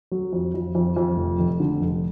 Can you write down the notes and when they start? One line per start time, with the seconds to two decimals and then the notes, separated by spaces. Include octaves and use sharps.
0.12 F#3
0.33 F2
0.54 F2
0.75 F2
0.96 F2
1.17 F1
1.39 F1
1.60 D3
1.81 F1